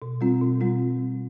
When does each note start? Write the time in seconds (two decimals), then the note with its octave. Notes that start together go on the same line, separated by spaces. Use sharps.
0.02 B2
0.21 G3 C4 F4
0.41 B2
0.61 G3 C4 F4